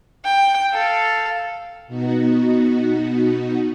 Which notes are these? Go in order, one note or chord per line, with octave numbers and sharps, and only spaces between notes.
G5
A4 F5
B2 B3 D#4 F#4